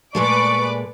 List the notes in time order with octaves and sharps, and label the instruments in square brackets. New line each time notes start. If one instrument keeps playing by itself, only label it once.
[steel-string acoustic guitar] A#2 G#3 A3 [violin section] B4 D5 D6 [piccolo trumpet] C#6